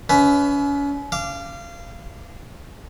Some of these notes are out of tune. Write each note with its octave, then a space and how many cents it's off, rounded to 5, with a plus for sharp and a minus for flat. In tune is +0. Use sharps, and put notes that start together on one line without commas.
C#4 +35 B4 +20 E5 +0
F5 -25 D6 +0